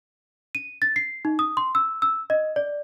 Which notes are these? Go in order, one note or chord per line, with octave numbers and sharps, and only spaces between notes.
D#7
A6
C7
D#4
D#6
C6
E6
E6
D#5
D5